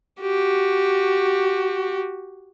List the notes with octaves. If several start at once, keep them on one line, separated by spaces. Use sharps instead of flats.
F#4 G4